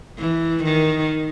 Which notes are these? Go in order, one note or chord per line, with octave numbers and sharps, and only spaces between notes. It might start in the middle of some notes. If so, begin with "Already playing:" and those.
E3
D#3